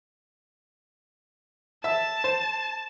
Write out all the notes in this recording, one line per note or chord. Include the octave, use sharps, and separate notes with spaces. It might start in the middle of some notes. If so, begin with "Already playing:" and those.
E5 A5 E6
C5